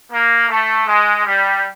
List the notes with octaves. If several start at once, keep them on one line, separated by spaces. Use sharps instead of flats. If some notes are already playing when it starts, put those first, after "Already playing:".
A#3
A3
G#3
G3